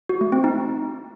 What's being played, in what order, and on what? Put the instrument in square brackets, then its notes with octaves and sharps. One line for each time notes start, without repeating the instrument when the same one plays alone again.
[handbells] F#4
A3
C4
D#4